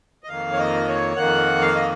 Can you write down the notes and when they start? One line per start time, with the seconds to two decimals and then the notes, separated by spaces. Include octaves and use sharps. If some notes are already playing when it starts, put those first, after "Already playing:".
0.24 D#5
0.29 F2 D#3 A#3 F5
0.52 C#5
0.59 D#5
0.88 C#5
1.16 F2 D#3 A#3 F#5
1.61 F5
1.75 D#5